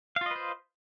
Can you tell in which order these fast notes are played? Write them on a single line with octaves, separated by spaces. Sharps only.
F5 F4 D#5 B4 C5